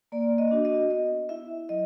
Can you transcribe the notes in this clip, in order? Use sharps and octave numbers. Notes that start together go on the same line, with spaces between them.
A#3 D5
D#5
D4 F#4
D#5
B3 D#5
E4 E5
F#3 D#5